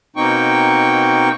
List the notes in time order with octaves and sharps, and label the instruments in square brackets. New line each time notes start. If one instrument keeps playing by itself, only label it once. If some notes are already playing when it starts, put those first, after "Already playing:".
[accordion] B2 A#3 C4 D#4 G5 C#6